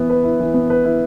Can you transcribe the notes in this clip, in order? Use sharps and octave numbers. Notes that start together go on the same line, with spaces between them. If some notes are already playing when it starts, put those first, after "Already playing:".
Already playing: E3 B3 E4
B4
E4
E3
B3
B4
E4